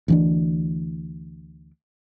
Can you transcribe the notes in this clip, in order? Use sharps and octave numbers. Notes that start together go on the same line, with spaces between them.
D2 E3 D4